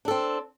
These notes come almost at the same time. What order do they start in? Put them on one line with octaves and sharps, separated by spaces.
D4 A4 C4